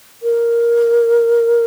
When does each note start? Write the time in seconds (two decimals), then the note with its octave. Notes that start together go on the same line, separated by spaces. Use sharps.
0.23 A#4